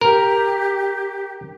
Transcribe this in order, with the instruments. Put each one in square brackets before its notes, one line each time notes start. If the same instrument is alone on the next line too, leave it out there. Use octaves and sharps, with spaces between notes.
[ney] G4 [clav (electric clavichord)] A#4